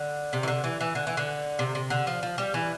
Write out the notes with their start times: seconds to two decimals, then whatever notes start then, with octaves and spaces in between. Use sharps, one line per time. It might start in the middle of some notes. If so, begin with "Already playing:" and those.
Already playing: D3
0.33 C3
0.43 E3
0.48 D3
0.64 E3
0.81 E3
0.95 D3
1.07 E3
1.17 D3
1.59 C3
1.75 C3
1.90 D3
2.07 F3
2.23 F3
2.38 G3
2.54 E3